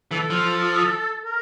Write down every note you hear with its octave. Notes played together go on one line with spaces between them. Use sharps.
E3 A4
F3
A#4